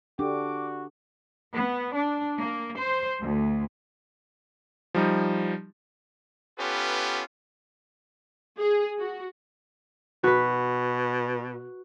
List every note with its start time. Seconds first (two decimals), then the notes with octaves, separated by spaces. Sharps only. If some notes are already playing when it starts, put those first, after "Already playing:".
0.19 D4 F#4 G4 A4 G5 D6
1.53 B3
1.94 D4
2.38 A#3
2.78 C5
3.21 D2
4.94 F3 G3 D#4
6.59 B3 C#4 F4 G4 A4 B4
8.59 G#4
8.98 F#4
10.24 B2 F#4 B4